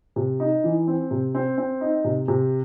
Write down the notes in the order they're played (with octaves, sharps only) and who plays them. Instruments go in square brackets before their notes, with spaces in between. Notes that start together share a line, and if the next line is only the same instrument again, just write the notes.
[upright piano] C3
D#4
E3
C4
C3
C4
C4
D#4
C3
C3